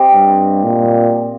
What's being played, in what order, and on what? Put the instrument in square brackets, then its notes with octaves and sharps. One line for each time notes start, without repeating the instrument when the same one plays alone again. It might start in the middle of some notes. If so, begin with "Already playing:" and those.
Already playing: [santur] C4 G4 D#5
[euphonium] G2
A#2